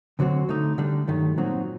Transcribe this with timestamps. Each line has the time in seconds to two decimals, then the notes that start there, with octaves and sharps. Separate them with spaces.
0.19 D2 D3 F#3 C4 F#4
0.49 D3 A3 D#4
0.78 D3 G3 D4
1.08 G2 D#3 F#3 A3
1.38 A#2 F#3 C4 D#4 F#4